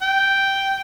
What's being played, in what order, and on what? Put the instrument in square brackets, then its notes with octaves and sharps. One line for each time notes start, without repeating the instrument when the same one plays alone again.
[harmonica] G5